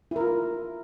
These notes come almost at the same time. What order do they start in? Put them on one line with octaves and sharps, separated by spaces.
E4 A#4 F4